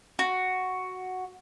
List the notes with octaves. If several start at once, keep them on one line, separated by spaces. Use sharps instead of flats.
F#4